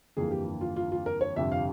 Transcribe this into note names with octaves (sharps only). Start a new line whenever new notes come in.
G1 F2 E3 A#3 G#4
G4
F4
F4
F4
A#4
C#5
G1 F2 C3 E5
F5